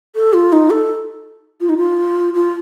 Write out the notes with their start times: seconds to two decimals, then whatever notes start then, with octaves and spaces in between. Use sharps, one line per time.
0.16 A4
0.33 F4
0.53 D#4
0.70 A4
1.61 F4
1.69 D#4
1.78 F4
2.34 F4